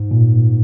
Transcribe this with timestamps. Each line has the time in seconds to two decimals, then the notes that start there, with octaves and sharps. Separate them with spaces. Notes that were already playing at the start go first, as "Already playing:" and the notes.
Already playing: G#2
0.11 A#2